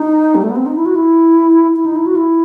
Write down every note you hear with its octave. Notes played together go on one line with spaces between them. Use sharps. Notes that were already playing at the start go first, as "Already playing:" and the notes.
Already playing: D#4
G3
A3
B3
C4
D#4
E4
F#4
E4
E4
D#4
E4
F#4
E4